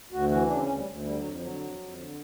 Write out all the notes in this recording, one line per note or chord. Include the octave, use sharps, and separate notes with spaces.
D2 F#4
E3 F#4
C#3 D4
C4
D2 C#4
G3
D2
D3 G3
F#3
F2
D3 F#3
F2
F2
D3